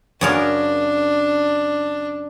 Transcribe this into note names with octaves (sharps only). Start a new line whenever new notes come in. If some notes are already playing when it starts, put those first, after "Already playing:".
F#2 C#3 D4 A#4